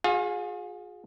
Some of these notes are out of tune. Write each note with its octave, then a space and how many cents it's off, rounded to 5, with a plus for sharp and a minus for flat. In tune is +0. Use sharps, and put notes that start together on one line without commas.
F4 +45 G#4 +0 F5 +5